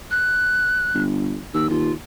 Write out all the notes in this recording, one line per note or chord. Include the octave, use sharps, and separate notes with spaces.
F#6
G1
D#2 E6
D#2 F4